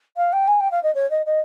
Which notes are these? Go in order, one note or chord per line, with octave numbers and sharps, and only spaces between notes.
F5
G5
G#5
G5
F5
D#5
C#5
D#5
D#5